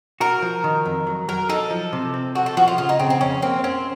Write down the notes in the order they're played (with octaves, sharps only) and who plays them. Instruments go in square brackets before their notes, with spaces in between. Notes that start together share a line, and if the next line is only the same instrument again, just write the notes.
[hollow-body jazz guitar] F#4 [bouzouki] A#4
[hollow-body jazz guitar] F3
D#3
F2
F#3
[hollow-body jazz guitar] F#3 [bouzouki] A#4
[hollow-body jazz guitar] D#4 [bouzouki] A4
[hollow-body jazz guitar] F3
C3
C4
[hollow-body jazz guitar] C4 [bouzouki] F#4
[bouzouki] A4
[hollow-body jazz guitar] F3 [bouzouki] F#4
[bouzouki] F4
[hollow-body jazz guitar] C#3 [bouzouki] F4
[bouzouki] D#4
[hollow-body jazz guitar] C#3 [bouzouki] C4
[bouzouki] C4
[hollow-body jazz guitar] F2 [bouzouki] C#4
[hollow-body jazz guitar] A#3 [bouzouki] C4
[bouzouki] C4 [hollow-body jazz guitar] C#4